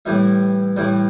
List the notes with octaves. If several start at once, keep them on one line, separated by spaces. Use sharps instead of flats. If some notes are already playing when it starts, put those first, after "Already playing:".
A2 E3 G3 E5
A2 E3 G3